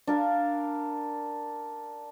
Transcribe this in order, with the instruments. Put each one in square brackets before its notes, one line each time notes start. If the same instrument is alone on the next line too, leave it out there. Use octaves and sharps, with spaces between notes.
[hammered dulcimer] D4 A#4 F5